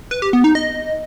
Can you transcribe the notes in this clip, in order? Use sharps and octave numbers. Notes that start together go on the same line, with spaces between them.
B4
G4
B3
D#4
D#5